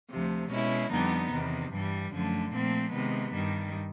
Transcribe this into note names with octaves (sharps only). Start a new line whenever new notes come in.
D2 C3 F3
B2 G#3 C#4 E4
F2 D3 G3 B3 D#4
E2 C3 D#3
G2 E3 G3
F#2 D3 F3 A3
A#2 F3 A3 C4
C3 D#3 G#3 B3
G2 D#3 G3